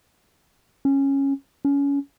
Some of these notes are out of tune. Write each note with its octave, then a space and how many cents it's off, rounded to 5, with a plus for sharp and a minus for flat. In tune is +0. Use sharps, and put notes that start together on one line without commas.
C#4 -10
C#4 +25